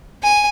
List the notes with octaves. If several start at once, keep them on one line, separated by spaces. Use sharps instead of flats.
G#5